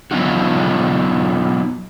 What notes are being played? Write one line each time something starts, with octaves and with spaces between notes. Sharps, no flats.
F#3 B3 D#4 F4 F#4